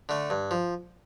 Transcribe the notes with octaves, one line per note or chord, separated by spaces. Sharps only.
D3 A3
G2
F3